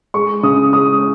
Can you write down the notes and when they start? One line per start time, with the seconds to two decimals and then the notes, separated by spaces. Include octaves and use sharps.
0.14 G#3 C#6
0.43 C#3 D#6
0.73 G#3 D#6